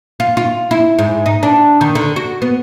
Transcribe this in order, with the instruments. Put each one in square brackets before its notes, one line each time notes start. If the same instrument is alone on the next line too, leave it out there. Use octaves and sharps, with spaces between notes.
[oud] F4
F4
E4
G#2
D#4
D4
D#3
D3
F#4
B3